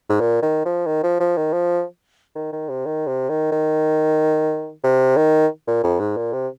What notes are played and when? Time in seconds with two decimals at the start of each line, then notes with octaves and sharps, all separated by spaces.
0.09 G#2
0.21 A#2
0.43 D#3
0.65 F3
0.87 D#3
1.03 F3
1.20 F3
1.37 D#3
1.53 F3
2.36 D#3
2.53 D#3
2.69 C3
2.86 D#3
3.07 C3
3.30 D#3
3.52 D#3
4.84 C3
5.17 D#3
5.68 A#2
5.84 F2
6.00 G#2
6.17 A#2
6.33 C3